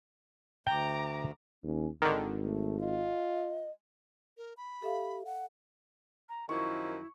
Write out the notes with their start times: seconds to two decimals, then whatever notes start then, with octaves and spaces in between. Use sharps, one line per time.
0.67 D2 G5 A#5 D6
1.63 D#2 C#4
2.02 G#1 D3 D#3 G#4
2.43 A3
2.80 F4 D#5
4.37 A#4
4.57 B5
4.82 G4 A4 E5 F5
5.25 F#5
6.29 A#5
6.49 F#2 D#3 F3 E4 C#6